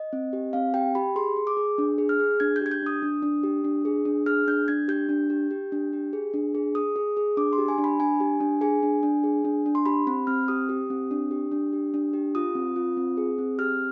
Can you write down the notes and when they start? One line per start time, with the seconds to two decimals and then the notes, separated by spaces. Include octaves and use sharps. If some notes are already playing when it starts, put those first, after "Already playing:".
Already playing: D#5
0.13 C4
0.33 G4
0.53 C4 F5
0.74 G4 G5
0.95 G4 B5
1.16 G#4 C6
1.36 G#4
1.47 D6
1.57 G#4
1.78 D4
1.98 G#4
2.09 F6
2.20 G#4
2.40 D4 G#6
2.56 G6
2.61 G4 G#6
2.71 G6
2.82 D4 D#6
3.02 D4
3.22 D4
3.43 G4
3.64 D4
3.85 G#4
4.05 D4
4.26 G#4 F6
4.47 D4 G6
4.68 D4 G#6
4.88 G4 G6
5.09 D4
5.30 G4
5.51 G4
5.72 D4
5.93 G4
6.13 G#4
6.34 D4
6.55 G#4
6.75 G#4 D#6
6.96 G#4
7.17 G#4
7.37 D4 D6
7.53 C6
7.58 G4
7.68 G#5
7.78 D4
7.84 B5
8.00 D4 G#5
8.20 G4
8.40 D4
8.61 G#4 G#5
8.83 D4
9.03 D4
9.24 G#4
9.45 D4
9.66 D4
9.75 C6
9.86 G4 B5
10.07 C4 B5
10.27 C4 F6
10.48 G4 D#6
10.69 G4
10.90 C4
11.11 D4
11.31 G4
11.52 D4
11.73 G4
11.94 D4
12.13 G4
12.35 F4 D#6
12.55 C4
12.76 F4
12.97 C4
13.17 G#4
13.38 C4
13.58 G4 F6